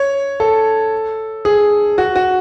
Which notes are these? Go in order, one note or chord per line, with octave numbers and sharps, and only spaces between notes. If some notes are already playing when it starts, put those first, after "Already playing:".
Already playing: C#5
A4
G#4
F#4
F#4